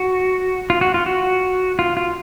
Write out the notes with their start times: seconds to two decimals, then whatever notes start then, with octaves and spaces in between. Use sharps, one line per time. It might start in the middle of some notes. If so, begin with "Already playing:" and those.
Already playing: F#4
0.70 F4
0.81 F#4
0.94 F4
1.06 F#4
1.79 F4
1.97 F4